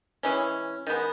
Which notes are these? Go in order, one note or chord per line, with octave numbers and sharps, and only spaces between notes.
E3 G#3 C#4
D#3 G#3 B3